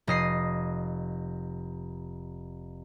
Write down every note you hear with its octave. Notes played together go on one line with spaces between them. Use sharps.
F1 D#5 C7 D#7